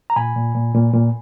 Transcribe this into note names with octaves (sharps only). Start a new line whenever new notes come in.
A#5
A#2 G#5 B5
A#2
A#2
A#2
A#2